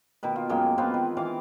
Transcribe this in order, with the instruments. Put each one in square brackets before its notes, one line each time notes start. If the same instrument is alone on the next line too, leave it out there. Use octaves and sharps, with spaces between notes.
[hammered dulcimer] B2 D#3 B4
F4
F#2 G#3 A#3 G5
B3 C4 F4 B4
D#3
E3 F5 D6